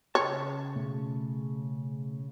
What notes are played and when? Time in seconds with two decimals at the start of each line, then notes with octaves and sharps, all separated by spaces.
0.15 C#3 C#5 A5
0.76 B2 A3